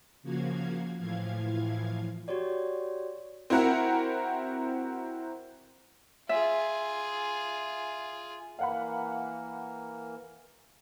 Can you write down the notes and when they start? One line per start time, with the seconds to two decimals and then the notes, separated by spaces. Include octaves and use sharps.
0.22 C#3 F3 A#3 F#4 F5 G#6
0.99 A2 E3 F3 F5 G#6
2.28 F#4 G4 C#5 D5
3.50 C4 E4 F#4 A#4 F#5
6.29 F4 G#4 E5
8.59 E3 A#3 A#4 F5 F#5 B5